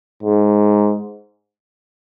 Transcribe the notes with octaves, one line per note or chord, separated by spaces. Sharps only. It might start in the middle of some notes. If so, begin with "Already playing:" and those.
G#2